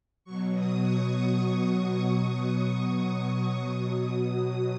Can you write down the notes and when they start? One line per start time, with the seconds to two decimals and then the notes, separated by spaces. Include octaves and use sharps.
0.24 B2 F#3 C#6
0.54 D#6
0.83 C#6
2.82 C#6
3.24 D#6
3.68 B2 F#3 D#6